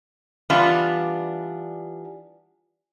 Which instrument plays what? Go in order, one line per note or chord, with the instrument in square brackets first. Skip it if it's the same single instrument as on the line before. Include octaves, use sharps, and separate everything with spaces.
[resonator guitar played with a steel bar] E3 G3 B3 D4 F4